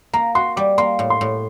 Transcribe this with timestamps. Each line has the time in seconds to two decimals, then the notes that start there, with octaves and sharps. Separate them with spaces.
0.13 A#3 A#5
0.35 F#4 C6
0.56 G3 D6
0.78 A#3 C6
0.99 A2
1.10 C6
1.21 A2